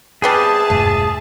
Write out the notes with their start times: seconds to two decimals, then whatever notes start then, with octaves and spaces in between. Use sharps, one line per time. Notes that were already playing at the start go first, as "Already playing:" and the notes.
0.22 G3 B3 C4 G#4 E5 A5
0.70 E1 G2 F3 A3